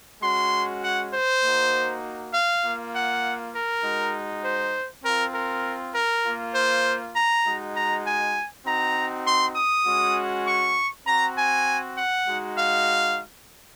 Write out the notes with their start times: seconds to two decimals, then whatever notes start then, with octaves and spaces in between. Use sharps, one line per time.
0.22 G#3 C#4 F#4 C6
0.83 F#5
1.13 C5
1.43 A#3 D#4 F#4
2.33 F5
2.63 A#3 F4
2.94 F#5
3.54 A#4
3.84 G#3 D#4 F#4
4.44 C5
5.04 C4 F4 A#4
5.34 A#4
5.95 A#4
6.25 A#3 F4
6.55 C5
7.15 A#5
7.45 G#3 D#4 F#4
7.76 A#5
8.06 G#5
8.65 C4 D#4 F#4 A#5
9.26 C6
9.56 D#6
9.86 G#3 C#4 F#4
10.47 C#6
11.07 C4 F#4 A#5
11.37 G#5
11.97 F#5
12.28 G#3 D#4 F#4
12.58 F5